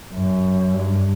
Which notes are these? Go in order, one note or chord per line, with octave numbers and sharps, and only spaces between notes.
F#2
G2